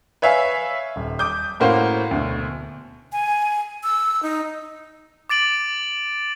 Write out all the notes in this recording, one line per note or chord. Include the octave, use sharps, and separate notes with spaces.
B4 C#5 E5 F5 G#5
D#1
D6 D#6 G6
A2 A#3 C#4 F#4 C5 F5
D2 B2
G#5
E6
D#4
D6 A6 D7 F#7